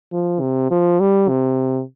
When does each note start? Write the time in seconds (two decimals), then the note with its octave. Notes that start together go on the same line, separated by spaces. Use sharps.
0.13 F3
0.40 C3
0.71 F3
1.00 G3
1.29 C3